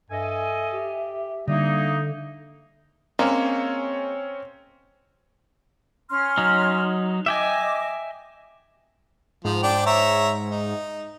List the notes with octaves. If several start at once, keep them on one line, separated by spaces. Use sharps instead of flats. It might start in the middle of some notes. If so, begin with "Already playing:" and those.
G2 A4 D#5 E5 G#5
G4
D3 G3 A#3 D#4 E5
G#3 A#3 C4 C#4 C#5
C#4 C6 F6
F#3 D#4
D#5 E5 G5 G#5 D6
G#2 F3
D4 G5 D6
C#5 E5 A#5
D#4